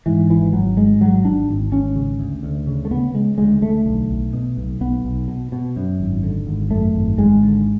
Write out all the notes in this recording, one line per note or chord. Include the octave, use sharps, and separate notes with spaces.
G#2 E3
G#1 E3
G#1 F#3
G#2 G#3
G#1 F#3
G#1 D4
G#1
G#1 C#4
C#3
D2
D2
C#3
A3
C#3 B3
C#3 G#3
D2 G#3
D2 A3
B1
B1
B2
B1
B1 B3
B1
B2
B2
F#2
G#1
D3
G#1
F#2 A3
G#1
G#1 G#3
D3